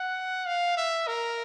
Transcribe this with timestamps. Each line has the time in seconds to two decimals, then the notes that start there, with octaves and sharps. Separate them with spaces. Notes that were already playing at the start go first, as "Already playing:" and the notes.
Already playing: F#5
0.46 F5
0.77 E5
1.08 A#4